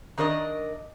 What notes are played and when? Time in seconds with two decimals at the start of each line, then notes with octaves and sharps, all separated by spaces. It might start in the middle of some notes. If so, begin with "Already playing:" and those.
0.18 D#3 D4 A#4 C#5 D#5